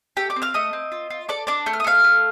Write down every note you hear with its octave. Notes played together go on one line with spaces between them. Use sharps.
A3 G4 G5
D5 D6
C4
F5 F6
A3 D#5 D#6
C4
F4
F4
A4 D5 D6
D4 D5 D6
A3 G6
F6
D#6
A3 F5 F6
A3